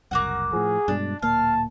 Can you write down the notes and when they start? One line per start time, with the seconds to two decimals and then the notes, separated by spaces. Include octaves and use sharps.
0.11 F#1 C2 A#3 F#4 F#5
0.53 A2 F3 G#4
0.88 G2 B2 G#3 D4
1.22 D1 A#2 A#3 F5 A5